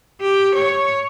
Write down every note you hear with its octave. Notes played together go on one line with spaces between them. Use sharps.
G4
C#5